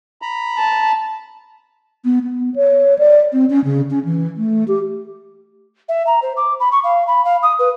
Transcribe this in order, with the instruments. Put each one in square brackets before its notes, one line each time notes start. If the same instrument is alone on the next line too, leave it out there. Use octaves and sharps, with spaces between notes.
[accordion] A#5 B5
[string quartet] A5
[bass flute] B3
B3
C#5
D5
C4
C#4
C#3
C#4
E3
A3
G4
[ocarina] E5
A#5
C5
D6
B5
C#6
F5
B5
F5
D#6
B4